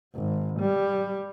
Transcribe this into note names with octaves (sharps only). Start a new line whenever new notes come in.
G#1
G3